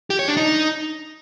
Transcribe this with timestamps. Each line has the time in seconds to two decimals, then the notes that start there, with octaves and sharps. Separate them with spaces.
0.10 G4
0.19 C#5
0.28 D4
0.37 D#4